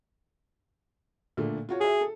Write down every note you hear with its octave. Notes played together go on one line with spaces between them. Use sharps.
A#2 D3 A3
F4 F#4 C#5
F#4 G#4 E5
A4